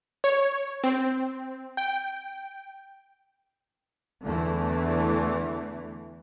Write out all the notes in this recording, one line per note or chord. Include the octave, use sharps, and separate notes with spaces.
C#5
C4
G5
E2 D3 E3 A3